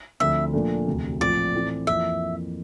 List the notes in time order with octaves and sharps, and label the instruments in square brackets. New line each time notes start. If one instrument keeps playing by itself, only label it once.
[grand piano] D2 D3 F3 C4 [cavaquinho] E5
[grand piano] A#2 F3 A3 D4
E1 D2 C3
[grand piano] A#1 A2 F3 C4 F4 [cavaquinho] D5
[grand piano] A2 E3 A3 C4 F4
[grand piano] F2 E3 A#3 F4 [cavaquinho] E5